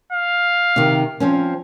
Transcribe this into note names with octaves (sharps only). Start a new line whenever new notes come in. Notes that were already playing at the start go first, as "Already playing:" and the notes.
F5
C3 D#3
F3 C4 C#4